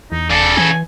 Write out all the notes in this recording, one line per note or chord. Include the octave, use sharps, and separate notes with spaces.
E2 D#4
F1 C#3 A4 D5
E3 G#5